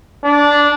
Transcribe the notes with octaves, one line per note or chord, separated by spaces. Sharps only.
D4